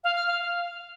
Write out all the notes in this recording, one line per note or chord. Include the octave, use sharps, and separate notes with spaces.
F5
F6
F5